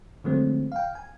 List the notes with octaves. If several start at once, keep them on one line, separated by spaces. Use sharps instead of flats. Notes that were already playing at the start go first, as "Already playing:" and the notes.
D3 F3 F#3 G#3 A3 C4
F5 G5
G#5